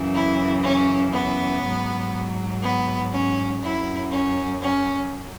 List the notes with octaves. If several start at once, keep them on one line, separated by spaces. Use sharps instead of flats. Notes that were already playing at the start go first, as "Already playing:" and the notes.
Already playing: F#2 C#3 E3
E4
C#4
B3
G#2 F#3
B3
C#4
F#2 F#3 E4
C#4
C#4